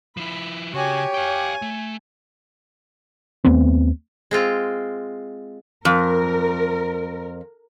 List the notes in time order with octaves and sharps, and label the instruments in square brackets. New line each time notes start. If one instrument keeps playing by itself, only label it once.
[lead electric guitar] F3 E4 [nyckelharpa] B5
[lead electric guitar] C#3 [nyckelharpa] F#4 G#5 [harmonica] G4 [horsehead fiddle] C#5
[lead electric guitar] F5 G5 [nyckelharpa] G#5
[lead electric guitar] A3
[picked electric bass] D#2 A3 B3 C4
[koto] G#3 C4 F4
[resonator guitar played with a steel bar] F2 [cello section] A#4